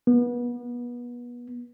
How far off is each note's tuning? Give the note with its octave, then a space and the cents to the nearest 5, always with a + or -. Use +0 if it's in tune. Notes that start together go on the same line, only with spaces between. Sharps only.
B3 -30